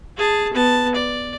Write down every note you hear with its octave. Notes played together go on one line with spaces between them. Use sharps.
G#4 A5
B3 A5
D5